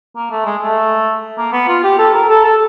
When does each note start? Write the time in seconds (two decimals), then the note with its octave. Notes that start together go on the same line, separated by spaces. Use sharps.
0.16 A#3
0.31 A3
0.46 G#3
0.61 A3
1.37 A#3
1.52 B3
1.68 F4
1.83 G4
1.98 A4
2.13 A#4
2.29 A4
2.44 A4